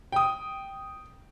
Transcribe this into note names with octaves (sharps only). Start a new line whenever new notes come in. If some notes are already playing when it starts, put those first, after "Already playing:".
G5 D#6